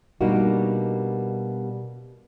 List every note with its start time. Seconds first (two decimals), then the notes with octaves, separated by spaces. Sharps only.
0.21 B2 G3 A#3 D4 D#4 F#4